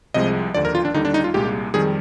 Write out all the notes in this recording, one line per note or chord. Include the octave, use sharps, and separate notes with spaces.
C2 C3 F3 G#3 D#5
D#2 D3 F3 D5
A#4
F4
D4
D#2 D3 G3 D#4
D4
D#4
F4
C2 A#2 G#3 G4
F2 D#3 G3 G#4